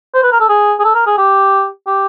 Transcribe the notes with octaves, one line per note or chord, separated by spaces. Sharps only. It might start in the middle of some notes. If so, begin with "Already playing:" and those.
C5
B4
A#4
A4
G#4
G#4
A4
A#4
G#4
G4
G4